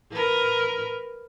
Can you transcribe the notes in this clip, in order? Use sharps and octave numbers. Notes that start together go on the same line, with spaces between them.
A#4 B4